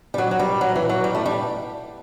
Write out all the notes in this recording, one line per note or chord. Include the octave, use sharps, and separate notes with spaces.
G3
F#3
F#3
G3
F#3
E3
F#3
G3
A3
G3